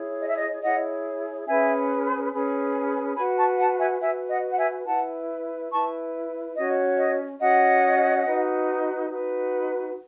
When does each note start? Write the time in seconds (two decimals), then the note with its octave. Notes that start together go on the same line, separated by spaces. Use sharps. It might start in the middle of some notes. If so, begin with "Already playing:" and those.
Already playing: E4 G#4 C#5
0.20 D#5
0.28 E5
0.37 D#5
0.63 E4 G#4 C#5 D#5 F#5
1.47 C#4 G#4 B4 E5 G#5
2.33 C#4 G#4 B4
3.16 F#4 B4 G#5 B5
3.38 A5 C#6
3.59 F#5 A5
3.80 E5 G#5
4.01 F#4 B4 E5 G#5
4.30 D#5 F#5
4.52 F#5
4.58 E5 G#5
4.86 E4 B4 F#5 A5
5.71 E4 B4 A5 C#6
6.56 C#4 F#4 C#5 D#5
6.98 D#5
7.40 C#4 F#4 C#5 D#5 F#5
8.25 D#4 F#4 B4
9.09 D#4 F#4 B4